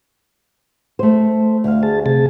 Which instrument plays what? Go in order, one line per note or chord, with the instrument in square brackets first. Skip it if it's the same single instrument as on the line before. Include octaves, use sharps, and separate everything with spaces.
[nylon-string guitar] A3 C5
D2 F5
[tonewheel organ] G#4 A5
C3 G#4 A5